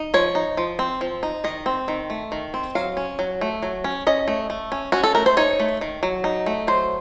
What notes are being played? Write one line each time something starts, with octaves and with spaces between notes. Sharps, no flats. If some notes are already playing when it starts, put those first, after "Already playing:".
Already playing: D#4
F3 C#5
D#4
F3
C4
F3
D#4
D#3 D#5
C4
D#3
A3
D#3
C4
F#3 F5
C#4
F#3
A3
F#3
C#4
C#4 D#5
A3
A3
C#4
C#4 F#4
A4
A3 A#4
C5
D#4 C#5
A3
D#3
F#3
D#4
A3
F#3 C5